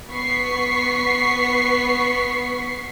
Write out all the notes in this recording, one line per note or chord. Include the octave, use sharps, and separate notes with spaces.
B3 C#6 B6 C7